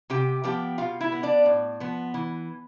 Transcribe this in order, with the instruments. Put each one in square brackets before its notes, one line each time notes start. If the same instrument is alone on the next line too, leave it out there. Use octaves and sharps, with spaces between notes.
[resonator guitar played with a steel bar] C3 G4 G5
F3 B3 G4 G5
B2 F4 F5
E4 E5
B3
D4 D5
A2
F3 B3
E3